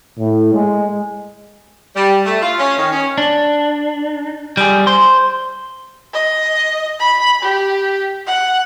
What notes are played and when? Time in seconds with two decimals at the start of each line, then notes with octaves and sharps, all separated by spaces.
0.19 A2
0.54 G#3
1.96 G3
2.26 A3
2.42 F4
2.59 C#4
2.77 D#3
2.92 C#4
3.18 D4
4.57 G3 G#4
4.87 C5
6.13 D#5
6.99 B5
7.42 G4
8.27 F#5